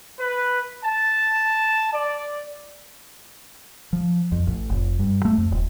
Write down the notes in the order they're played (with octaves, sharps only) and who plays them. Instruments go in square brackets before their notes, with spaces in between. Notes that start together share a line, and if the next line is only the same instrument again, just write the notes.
[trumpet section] B4
A5
D5
[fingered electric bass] F3
F2
A1
F1
G2
A3
F2
D#1